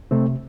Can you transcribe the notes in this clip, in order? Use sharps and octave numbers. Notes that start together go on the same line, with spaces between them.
C3 A3 C4